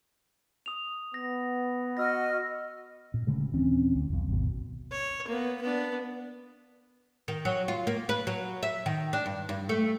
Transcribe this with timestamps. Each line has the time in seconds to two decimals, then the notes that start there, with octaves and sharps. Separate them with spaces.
0.66 D#6 F7
1.14 B3 A#6
1.97 F#4 D#5 E6 F6 A#6
3.14 A#2
3.27 D1 D2 C#3 G#3
3.54 D#1 E3 C4 C#4
3.95 D2
4.10 E1 B1
4.28 G#1 D#2 B2
4.91 C#5
5.28 A#3 B3
5.62 B3 D4
7.28 D#3
7.45 F#3
7.68 F4
7.87 A#3
8.09 B4
8.27 F#3
8.63 E5
8.86 D#3
9.13 D4
9.26 G2
9.49 G2
9.69 A3